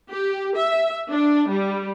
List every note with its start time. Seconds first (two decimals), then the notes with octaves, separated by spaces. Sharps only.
0.11 G4
0.56 E5
1.09 D4
1.49 G3